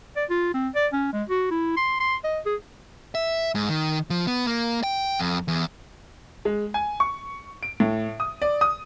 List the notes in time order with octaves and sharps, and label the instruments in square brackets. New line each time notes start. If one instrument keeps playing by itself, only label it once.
[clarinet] D5
F4
C4
D5
C#4
G#3
F#4
E4
C6
C6
D#5
G#4
[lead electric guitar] E5
G#2
D#3
F3
B3
A#3
G5
F2
E2
[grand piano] G#3
G#5
C#6
D7
A2
D#6
D5
D#6